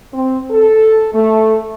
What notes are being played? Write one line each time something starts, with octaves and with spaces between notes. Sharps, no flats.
C4
A4
A3